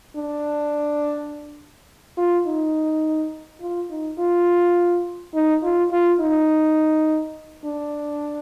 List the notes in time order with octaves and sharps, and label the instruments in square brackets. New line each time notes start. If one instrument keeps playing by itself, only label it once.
[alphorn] D4
F4
D#4
F4
D#4
F4
D#4
F4
F4
D#4
D4